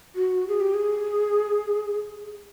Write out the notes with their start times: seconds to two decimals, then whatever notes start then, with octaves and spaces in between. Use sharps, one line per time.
0.15 F#4
0.48 G#4
0.60 G4
0.74 G#4